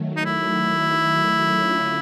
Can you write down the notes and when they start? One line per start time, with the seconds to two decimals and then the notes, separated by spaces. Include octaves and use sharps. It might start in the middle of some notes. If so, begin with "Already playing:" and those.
Already playing: D#3 F#3 A3
0.17 D#4
0.25 E4
1.39 D3 F#3 A3 C#4 F4